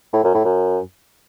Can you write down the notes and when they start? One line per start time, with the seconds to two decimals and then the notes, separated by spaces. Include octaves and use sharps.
0.13 A2
0.24 F#2
0.34 A2
0.45 F#2